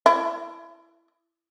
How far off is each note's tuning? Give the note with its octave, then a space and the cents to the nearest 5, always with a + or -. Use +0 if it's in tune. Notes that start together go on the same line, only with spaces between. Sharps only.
E4 +20